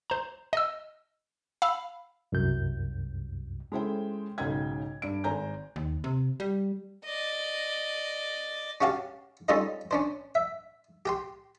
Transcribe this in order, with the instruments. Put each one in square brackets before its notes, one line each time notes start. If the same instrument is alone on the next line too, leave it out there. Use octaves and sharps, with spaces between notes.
[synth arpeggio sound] C5 A#5
D#5 E6
F5 B5 E6
[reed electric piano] C2 F#2 G6
[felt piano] G#3 A3 C#4 E4 C5 G5
B1 G#2 C#3 D#5 G5 G#6
G2 D7
G#1 C5 G#5 A#5 G6
[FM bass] D#2
C3
G3
[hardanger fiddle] D5 D#5
[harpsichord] C#4 F#4 G4 F5 A5
G3 C#4 D#4 F4 A4 D#5
C#4 D4 C5
E5
G4 G5 C6